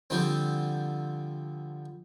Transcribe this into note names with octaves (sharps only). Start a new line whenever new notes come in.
D3 F3 G3 C4